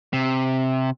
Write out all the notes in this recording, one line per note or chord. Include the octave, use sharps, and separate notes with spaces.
C3